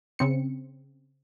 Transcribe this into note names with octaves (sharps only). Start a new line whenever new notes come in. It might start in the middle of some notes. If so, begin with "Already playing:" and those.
C#3 C4 C#7